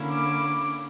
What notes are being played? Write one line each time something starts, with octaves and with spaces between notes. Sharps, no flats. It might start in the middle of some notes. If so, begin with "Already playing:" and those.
Already playing: D3 A#3 C#4 E4
D6